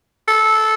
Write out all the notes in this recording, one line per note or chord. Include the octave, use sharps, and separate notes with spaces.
A4